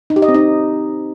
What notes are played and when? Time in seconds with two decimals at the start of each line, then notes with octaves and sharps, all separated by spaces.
0.10 D#4
0.16 G4
0.22 D#5
0.28 C4
0.34 D#4